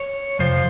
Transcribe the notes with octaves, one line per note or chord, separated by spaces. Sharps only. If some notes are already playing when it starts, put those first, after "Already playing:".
Already playing: C#5
F2 C3 F3 C5